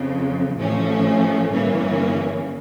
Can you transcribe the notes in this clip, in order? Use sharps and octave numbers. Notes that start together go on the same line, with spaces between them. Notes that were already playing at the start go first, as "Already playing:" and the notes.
Already playing: F2 C#3 F3
A1 A2 F3 A3 C#4
G1 G2 E3 A#3 C#4